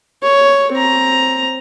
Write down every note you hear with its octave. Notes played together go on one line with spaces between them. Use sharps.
C#5
C4 A#5